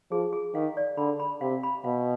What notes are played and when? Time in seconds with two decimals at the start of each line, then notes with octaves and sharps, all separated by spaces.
0.11 F3 G#4
0.33 G#4
0.54 D#3 F5
0.77 D5
0.97 D3 B5
1.20 B5
1.41 C3 F5
1.63 B5
1.84 B2 F5